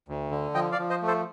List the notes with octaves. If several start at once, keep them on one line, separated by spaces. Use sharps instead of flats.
D2
D3
F3 D#5 G5
D5 F5
F3
C5 D#5
A3
A4 C5